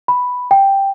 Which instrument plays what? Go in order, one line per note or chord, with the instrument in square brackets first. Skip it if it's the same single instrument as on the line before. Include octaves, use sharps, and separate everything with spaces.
[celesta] B5
G5